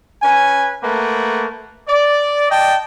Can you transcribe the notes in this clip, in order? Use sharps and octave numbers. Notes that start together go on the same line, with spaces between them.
C#4 B4 G#5
A3 A#3 B4 F#5
D5
D5 D#5 G5 A5